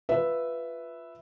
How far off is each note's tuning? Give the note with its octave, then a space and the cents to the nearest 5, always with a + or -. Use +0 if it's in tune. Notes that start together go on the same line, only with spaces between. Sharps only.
F4 +0 B4 +0 E5 +0